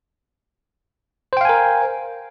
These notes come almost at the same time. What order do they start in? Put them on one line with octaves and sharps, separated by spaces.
C5 G5 F5 G#5 A#4